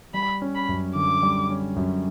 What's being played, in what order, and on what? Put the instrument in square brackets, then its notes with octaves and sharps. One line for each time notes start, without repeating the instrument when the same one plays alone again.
[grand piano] G3 [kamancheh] B5
[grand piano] C#4
[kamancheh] B5
[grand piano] F#2
[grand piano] D3 [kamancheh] D6
[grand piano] G3
C#4
F#2